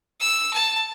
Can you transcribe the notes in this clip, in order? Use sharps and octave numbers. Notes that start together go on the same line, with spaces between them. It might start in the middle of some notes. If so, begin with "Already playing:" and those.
E6
A5